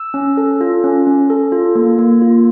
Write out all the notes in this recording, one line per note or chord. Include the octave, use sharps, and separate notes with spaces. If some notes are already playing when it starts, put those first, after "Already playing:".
Already playing: E6
C#4
A4
F4
C#4
C#4
A4
F4
A#3
A#3
F4